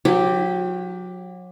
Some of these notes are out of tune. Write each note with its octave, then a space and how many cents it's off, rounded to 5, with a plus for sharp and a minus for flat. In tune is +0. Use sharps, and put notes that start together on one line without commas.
F#3 -30 G4 +0